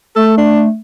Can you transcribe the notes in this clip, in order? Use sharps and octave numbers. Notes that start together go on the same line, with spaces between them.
A3 A4
D4